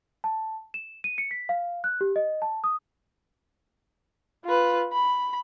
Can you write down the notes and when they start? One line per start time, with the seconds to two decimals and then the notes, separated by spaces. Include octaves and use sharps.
0.24 A5
0.74 E7
1.04 D#7
1.18 C#7
1.31 B6
1.49 F5
1.84 F#6
2.01 G4
2.16 D#5
2.42 A5
2.64 D#6
4.45 F4 B4
4.92 B5